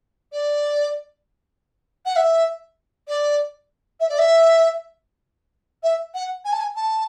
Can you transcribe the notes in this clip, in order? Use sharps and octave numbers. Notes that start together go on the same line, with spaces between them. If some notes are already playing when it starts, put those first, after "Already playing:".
D5
F#5
E5
D5
E5
D5
E5
E5
F#5
G#5
A5
G#5
A5